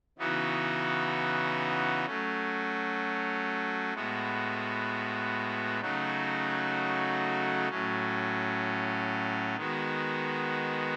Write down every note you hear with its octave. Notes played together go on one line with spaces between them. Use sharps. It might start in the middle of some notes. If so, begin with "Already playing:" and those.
C#3 E3 B3 D#4 F#4
F#3 A3 C#4
A2 G#3 B3 F#4
C#3 F#3 A3 D#4 F#4
A2 F#3 C#4
D#3 G#3 B3 F#4